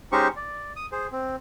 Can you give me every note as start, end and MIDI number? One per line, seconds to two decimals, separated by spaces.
0.12 0.28 56
0.12 0.28 61
0.12 0.28 63
0.12 0.28 67
0.12 0.28 72
0.12 0.28 85
0.36 0.73 74
0.76 0.86 87
0.92 1.07 68
0.92 1.07 72
1.12 1.36 60